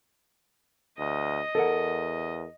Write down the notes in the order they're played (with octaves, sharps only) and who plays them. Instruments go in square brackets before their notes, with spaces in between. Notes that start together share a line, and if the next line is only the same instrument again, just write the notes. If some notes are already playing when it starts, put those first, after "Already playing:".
[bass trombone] D2 [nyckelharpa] D#5
[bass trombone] E2 [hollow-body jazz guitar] A4 A#4 F#5